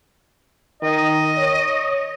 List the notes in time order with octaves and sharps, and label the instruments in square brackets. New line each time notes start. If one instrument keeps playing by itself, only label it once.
[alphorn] D#3 [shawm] D#5
[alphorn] C#5